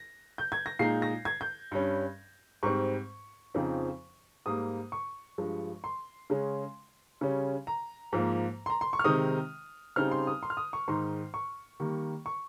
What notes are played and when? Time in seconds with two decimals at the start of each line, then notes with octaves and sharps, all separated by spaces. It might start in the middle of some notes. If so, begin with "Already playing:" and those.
Already playing: A#6
0.38 G6
0.52 G#6
0.66 A#6
0.79 A#2 G#3 D#4 C7
1.02 A#6
1.25 G#6
1.41 G6
1.71 G2 G3 C#4
2.63 G#2 G3 C4 C#6
3.54 F2 C#3 F3 C4 D#4
4.46 G#2 G3 A#3 D#6
4.92 C#6
5.38 G2 F3 G#3
5.84 C6
6.30 C#3 G#3 C#4
7.21 C#3 G3 C#4
7.67 A#5
8.13 G#2 F3 A#3
8.66 C6
8.70 A#5
8.81 C6
8.93 C#6
8.99 F6
9.04 C3 D#3 G#3 C4 D#4 D#6
9.96 C#3 G3 C4 D#4 F6
10.12 C6
10.27 D#6
10.43 C6
10.50 F6
10.57 D#6
10.73 C#6
10.88 G#2 D#3 G#3 D#4 C6
11.34 C#6
11.80 D#3 G3 A#3
12.26 C#6